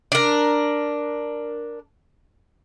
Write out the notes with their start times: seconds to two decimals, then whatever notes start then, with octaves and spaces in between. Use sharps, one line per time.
0.12 D4 A#4